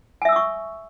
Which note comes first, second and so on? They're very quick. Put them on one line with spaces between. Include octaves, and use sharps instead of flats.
G#5 E5 E6 D#6 C#6